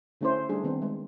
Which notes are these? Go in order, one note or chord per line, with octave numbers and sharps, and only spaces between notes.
D3 A3 C#4 E4 C5
G3 A3 D4 G#4
D#3 B3 C4
G#3